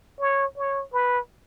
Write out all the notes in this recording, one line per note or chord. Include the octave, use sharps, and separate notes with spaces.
C#5
C#5
B4